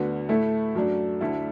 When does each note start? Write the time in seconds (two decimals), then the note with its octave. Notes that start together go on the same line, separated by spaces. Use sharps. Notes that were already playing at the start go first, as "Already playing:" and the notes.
Already playing: D2 D3 B3 F#4
0.29 A2 A3 E4 A4
0.75 F#2 F#3 A3 D4
1.20 D2 D3 A3 E4 A4